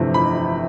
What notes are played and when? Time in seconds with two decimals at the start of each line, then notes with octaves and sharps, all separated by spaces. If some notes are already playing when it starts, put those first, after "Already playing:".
Already playing: G1 F2 C3 E3 A3
0.14 B5